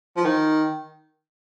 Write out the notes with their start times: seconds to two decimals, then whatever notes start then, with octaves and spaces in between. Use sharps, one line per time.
0.17 F3
0.25 D#3